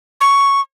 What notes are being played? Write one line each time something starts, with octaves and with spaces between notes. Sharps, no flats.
C#6